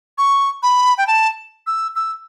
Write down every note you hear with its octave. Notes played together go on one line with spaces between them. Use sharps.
C#6
B5
G5
A5
E6
E6